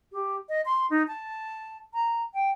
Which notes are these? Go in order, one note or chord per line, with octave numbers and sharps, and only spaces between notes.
G4
D#5
C6
D#4
A5
A#5
G5